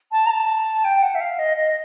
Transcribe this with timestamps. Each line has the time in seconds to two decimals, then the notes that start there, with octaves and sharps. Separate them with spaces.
0.12 A5
0.26 A#5
0.31 A5
0.84 G5
1.02 F#5
1.15 E5
1.21 F5
1.39 D#5
1.57 D#5